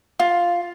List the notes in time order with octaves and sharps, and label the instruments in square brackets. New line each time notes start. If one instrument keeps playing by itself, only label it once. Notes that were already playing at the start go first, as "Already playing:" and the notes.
[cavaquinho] F4